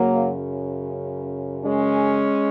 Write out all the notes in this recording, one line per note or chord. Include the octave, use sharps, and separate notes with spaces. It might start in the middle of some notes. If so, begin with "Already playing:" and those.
Already playing: F#2 C#3 F#3 A#3
G#3 C#4